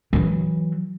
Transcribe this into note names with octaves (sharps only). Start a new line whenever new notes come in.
E3 F#3